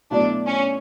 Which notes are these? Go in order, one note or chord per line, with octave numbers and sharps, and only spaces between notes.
B2 F#3 A3 D4 E4
C#4